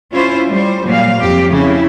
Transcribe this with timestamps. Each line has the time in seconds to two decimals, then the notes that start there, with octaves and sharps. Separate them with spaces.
0.12 C#4 E4 F4 C5
0.48 G3 C5
0.86 A#2 F#3 G3 F5
1.20 F2 C4 G4
1.51 C#3 C#4 E4